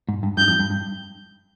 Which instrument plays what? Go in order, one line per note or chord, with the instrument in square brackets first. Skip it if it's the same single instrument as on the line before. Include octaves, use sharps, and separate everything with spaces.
[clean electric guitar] G#2
G2
[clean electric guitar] G2 [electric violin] G6
[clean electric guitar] F2
G2
G2